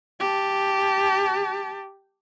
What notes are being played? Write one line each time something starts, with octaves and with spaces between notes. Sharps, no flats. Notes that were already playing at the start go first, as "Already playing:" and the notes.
G4 A5